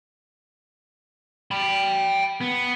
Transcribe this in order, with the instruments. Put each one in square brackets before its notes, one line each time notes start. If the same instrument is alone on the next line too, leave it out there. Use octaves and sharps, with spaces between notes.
[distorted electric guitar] G5 B5
B3